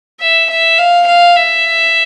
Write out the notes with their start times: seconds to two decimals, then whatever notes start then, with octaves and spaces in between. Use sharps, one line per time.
0.20 E5
0.50 E5
0.78 F5
1.07 F5
1.35 E5